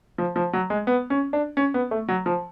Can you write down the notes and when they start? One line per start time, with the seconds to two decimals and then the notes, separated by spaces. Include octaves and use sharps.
0.18 F3
0.36 F3
0.53 F#3
0.70 G#3
0.87 B3
1.10 C#4
1.33 D4
1.57 C#4
1.74 B3
1.91 A3
2.08 F#3
2.26 F3